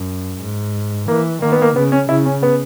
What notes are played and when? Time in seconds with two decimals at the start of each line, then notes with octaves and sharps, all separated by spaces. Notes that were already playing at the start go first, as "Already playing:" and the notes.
Already playing: F#2
0.41 G#2
1.08 E3 A#3
1.42 D#3 A#3
1.52 B3
1.62 A#3
1.76 C#3 B3
1.92 C#4
2.09 C#3 E4
2.26 C#4
2.43 B3